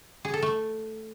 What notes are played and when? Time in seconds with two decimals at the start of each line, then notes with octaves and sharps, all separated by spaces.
0.25 G#4
0.34 A4
0.43 A3